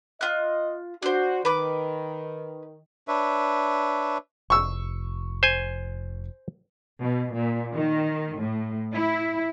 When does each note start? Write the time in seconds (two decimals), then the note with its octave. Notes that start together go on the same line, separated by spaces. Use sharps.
0.21 F4 D#5 F#6
1.02 D4 F#4 C5
1.45 D#3 B4 D6
3.08 D4 B4 C#5 E5
4.50 F1 C#6 E6
5.43 C5 G#5
7.00 B2
7.36 A#2
7.73 D#3
8.37 A2
8.94 E4